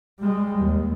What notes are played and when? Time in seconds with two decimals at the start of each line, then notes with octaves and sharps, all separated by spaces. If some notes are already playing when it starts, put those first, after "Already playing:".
0.20 G3 G#3
0.60 D#2